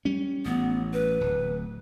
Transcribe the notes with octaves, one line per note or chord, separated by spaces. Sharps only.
G3 C#4
A1 B3
B4
D1